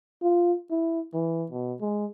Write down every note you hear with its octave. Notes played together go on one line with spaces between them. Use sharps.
F4
E4
E3
B2
G#3